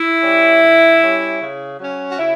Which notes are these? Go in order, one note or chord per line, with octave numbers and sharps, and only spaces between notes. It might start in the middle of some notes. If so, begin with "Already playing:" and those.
Already playing: E4
G3 C#4
D3
G3 C#4
C#3
F#3 C#4
F#4
C#3 E4